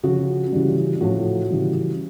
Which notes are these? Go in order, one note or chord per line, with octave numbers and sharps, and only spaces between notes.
C#3 F3 F#4
C#3 E3 G3
A2 F3 F#4
C#3 E3 G3